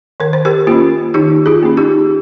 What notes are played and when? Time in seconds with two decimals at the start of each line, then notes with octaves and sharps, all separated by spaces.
0.20 D#3 A#4
0.33 C5
0.45 G4 A#4
0.67 A#3 C#4 F4
1.14 D#3 D#4 G4
1.46 F4 G#4
1.63 A#3 C#4
1.77 D#4 G4